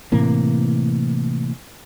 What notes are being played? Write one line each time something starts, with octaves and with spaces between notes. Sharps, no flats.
A2 C3 E3 A#3